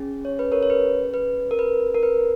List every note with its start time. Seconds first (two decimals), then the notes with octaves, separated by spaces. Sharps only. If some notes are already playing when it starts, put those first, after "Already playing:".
Already playing: C#4 G#4
0.25 C#5
0.39 B4
0.52 A#4 C#5
0.63 C#5
0.70 B4
1.14 B4
1.51 A#4
1.59 B4
1.94 A#4
2.03 B4